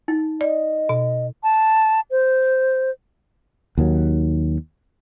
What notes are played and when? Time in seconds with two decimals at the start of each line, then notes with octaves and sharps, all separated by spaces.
0.08 D#4
0.41 D5 D#5
0.89 B2
1.43 A5
2.11 C5
3.78 D#2 D#3 F#3